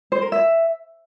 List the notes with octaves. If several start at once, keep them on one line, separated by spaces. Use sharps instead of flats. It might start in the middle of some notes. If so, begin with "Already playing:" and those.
C5
A#4
E5